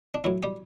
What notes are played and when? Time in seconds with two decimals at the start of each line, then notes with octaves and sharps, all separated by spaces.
0.14 D4
0.24 A2 F#3 E4
0.43 G3 G4